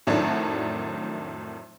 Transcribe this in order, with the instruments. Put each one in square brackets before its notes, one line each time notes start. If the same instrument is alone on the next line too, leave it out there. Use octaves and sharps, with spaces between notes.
[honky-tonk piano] F2 A2 D#3 F#3 A3 D4